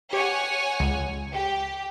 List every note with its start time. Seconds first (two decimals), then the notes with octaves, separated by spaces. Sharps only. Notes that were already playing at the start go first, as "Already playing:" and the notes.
0.13 G4 C#5 F#5 G#5
0.80 C#2
1.33 G4